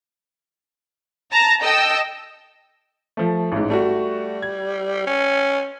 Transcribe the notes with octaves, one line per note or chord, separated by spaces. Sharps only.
A5 A#5 A#6
A4 D#5 G5 E6
F3 A3
A1 G#2
G3 A3 F#4
G#6
C#4